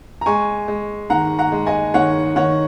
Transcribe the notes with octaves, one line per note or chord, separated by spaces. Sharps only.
A#5
G#3 G#5 C#6
G#3
D#3 F#5 A#5
F#5 A#5
G#3
D#5 G#5
D#3 C#5 F#5
D#3 C#5 F#5